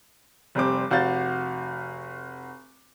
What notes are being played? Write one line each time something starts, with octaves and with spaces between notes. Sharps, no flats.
F1 G3 C4 D6
F1 F#4 F5 G6 A6